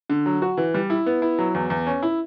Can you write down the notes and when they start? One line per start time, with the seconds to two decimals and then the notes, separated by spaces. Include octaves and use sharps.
0.10 D3
0.26 F#3
0.42 F#4
0.57 E3
0.74 G3
0.90 E4
1.06 B3
1.22 E4
1.39 F#3
1.55 E2
1.70 E2
1.86 C#4
2.03 E4